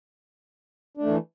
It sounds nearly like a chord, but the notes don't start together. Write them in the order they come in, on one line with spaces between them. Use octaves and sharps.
D4 A3 E3